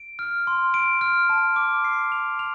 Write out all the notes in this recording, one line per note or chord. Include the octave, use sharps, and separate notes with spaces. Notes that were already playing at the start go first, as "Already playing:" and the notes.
Already playing: D7
F6
C6
D7
F6
A5
D6
C7
F7
F7